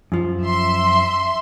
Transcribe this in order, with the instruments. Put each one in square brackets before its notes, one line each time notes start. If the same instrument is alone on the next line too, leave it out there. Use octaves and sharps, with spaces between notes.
[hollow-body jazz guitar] F#2 F3 F4
[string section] E5 C6